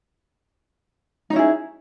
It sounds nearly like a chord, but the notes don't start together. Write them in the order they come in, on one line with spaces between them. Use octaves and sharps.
D#4 C#4 E4 G#4